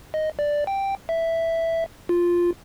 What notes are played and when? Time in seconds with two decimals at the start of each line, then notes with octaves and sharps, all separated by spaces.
0.14 D#5
0.39 D5
0.67 G5
1.09 E5
2.09 F4